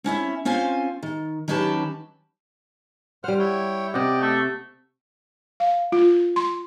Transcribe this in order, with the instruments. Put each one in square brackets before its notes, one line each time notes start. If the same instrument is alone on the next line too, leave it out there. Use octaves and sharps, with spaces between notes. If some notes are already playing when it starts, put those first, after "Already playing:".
[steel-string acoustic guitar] C4 C#4 E4 E5
C4 C#4 F4 C5 F5 G#5
D#3
D#3 F#3 C#4 G4 B4 A5
[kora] G3 F#5 [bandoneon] C5 F6
[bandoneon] E4 C#5 G5
[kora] C3 F#5 [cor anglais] G4 [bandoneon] D5 D#5
[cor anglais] A3
[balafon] F5
F4
C6